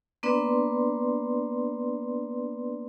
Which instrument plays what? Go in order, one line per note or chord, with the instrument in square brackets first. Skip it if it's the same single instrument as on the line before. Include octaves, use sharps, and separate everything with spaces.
[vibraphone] A#3 B3 D4 B4 D5 C6